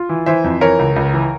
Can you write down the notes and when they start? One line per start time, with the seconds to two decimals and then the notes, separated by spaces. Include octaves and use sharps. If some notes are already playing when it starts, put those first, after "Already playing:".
Already playing: F4
0.09 E3
0.26 E3 C5 E5
0.44 F2
0.61 E3 A#4 C#5
0.79 C#2
0.96 C#2
1.14 E3